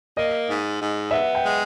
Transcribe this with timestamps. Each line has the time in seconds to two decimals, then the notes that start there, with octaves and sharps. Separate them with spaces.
0.17 A#3 D#5
0.49 G#2
0.80 G#2
1.11 B3 E5
1.35 G5
1.43 G#3